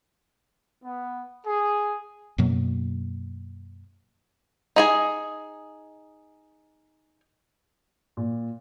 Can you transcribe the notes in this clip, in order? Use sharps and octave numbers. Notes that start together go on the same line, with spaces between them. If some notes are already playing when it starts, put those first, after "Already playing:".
B3
G#4
F#2 B2 F#3 A#3
D#4 G#4 G#5
A#2